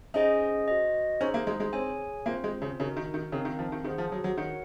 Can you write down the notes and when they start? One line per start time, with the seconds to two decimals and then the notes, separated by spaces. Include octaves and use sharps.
0.14 C#4 D#4 G#4 C5 D#5 G#5
0.68 F#4 C5 D#5
1.21 C#4 D#4 G#4 C5
1.34 A#3
1.47 G#3
1.60 G#3
1.73 C4 G#4 C#5 G#5
2.26 A#3 C4 F4 C5
2.44 G#3
2.62 C#3
2.80 C#3 D#4 F#4 A#4
2.97 D#3
3.14 D#3
3.32 C#3 C4 D#4 A#4 F5
3.45 D#3
3.59 F3
3.72 D#3
3.84 D#3 G#4 C5 F#5
3.98 F3
4.12 F#3
4.24 F#3
4.37 D#3 F#4 A#4 C#5 F#5